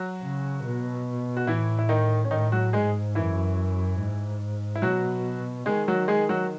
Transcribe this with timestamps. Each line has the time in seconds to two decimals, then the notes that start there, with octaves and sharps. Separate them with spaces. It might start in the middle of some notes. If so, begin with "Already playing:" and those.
Already playing: F#3 F#4
0.22 C#3
0.64 B2
1.37 F#4
1.47 A2 E3 E4
1.79 E4
1.89 D#3 D#4
2.25 C#4
2.31 A2 D#3 D#4
2.52 F#3 F#4
2.73 G#2 G#3 G#4
3.15 F#2 E3 E4
3.99 G#2
4.76 E4
4.82 B2 F#3 F#4
5.66 D#3 G#3 G#4
5.88 F#3 F#4
6.08 G#3 G#4
6.29 F#3 F#4